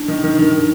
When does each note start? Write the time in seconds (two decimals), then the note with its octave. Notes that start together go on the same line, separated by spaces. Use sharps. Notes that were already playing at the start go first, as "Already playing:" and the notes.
Already playing: D4
0.08 D#3
0.24 D#3
0.39 D#3